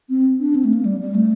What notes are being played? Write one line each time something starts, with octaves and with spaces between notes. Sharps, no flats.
C4
D4
C4
A3
A#3
G3
G3
A3